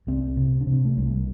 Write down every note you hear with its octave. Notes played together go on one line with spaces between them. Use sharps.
C2 C4
C3
D4
C3
C4
A3
C2 G3